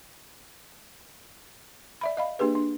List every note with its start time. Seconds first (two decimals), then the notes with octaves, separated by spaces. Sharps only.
2.01 D5 E5 B5
2.17 D#5 F5 B5
2.39 A#3 D4 G4 G#4 B4
2.55 D4